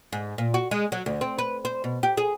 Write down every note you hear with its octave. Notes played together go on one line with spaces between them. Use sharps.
G#2
A#2
F#4
G#3
F#3
D2
C4
B4
C5
B2
G4
G#4